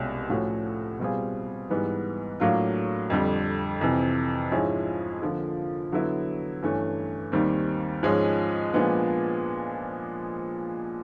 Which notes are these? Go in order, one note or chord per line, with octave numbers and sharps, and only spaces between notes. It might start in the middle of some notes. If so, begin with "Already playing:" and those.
Already playing: C2 B2 G#3 C#4 F4
A2 F3 A3 C#4 F#4
B2 G3 C4 F4 G#4
G#2 E3 G3 B3
A2 F#3 A#3 D4 F4
F2 D3 G3
F2 C3 E3
G#2 F3 G#3 C#4 E4
D3 F3 A#3
D3 F#3 B3 E4
G2 E3 A3 C#4
D#2 D#3 G3 C4
G#2 F3 G#3 C#4
A#2 F3 G#3 B3 D4